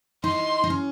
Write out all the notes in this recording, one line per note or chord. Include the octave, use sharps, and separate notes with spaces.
D#4 C6
D#4
C#4